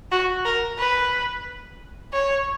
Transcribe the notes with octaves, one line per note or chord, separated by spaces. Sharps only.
F#4
A#4
B4
C#5